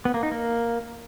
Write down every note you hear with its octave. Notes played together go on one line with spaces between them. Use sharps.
B3
A#3
D#4
A#3